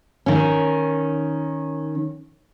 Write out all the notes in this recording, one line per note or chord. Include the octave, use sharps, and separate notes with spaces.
D#3 C#4